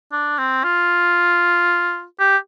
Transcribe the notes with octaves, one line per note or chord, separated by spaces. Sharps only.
D4
C4
F4
G4